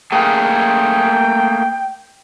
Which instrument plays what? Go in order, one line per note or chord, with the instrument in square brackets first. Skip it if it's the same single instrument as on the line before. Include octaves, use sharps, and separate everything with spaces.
[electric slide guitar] A3 A#3 G#4 [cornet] G5